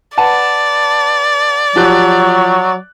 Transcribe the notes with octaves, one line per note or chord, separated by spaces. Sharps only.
B4 D5 F#5 A5
F3 F#3 G4 F#6